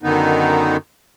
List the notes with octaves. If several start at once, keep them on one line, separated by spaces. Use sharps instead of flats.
F#2 D3 D#3 B3 D#4